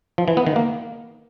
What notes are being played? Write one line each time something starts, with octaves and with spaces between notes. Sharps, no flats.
F3
E3
B3
D#3
A#3